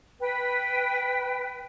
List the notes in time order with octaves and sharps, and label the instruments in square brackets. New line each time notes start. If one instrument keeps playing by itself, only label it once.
[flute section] B4 G5